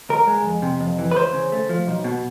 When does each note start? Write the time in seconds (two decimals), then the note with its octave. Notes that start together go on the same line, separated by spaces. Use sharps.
0.09 C#2 A#4
0.27 G#3
0.46 F2
0.62 C3
0.81 F2
0.99 E3
1.11 B4
1.16 C#2 C5
1.34 C#3
1.52 A3
1.69 F3
1.87 B1
2.04 B2